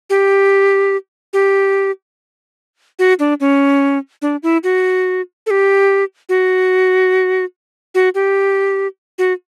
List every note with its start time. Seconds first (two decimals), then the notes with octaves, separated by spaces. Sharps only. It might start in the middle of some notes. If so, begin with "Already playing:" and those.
0.10 G4
1.33 G4
2.99 F#4
3.19 D4
3.40 C#4
4.22 D4
4.43 E4
4.64 F#4
5.46 A4
5.50 G4
6.29 F#4
7.95 F#4
8.15 G4
9.18 F#4